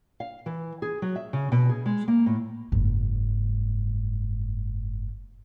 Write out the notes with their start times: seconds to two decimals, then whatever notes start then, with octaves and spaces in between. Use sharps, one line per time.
0.20 F5
0.46 E3
0.82 G#4
1.02 F#3
1.16 E5
1.33 C#3
1.52 B2
1.69 G#4
1.86 G#3
2.08 A#3
2.26 A2
2.72 F#1 G#2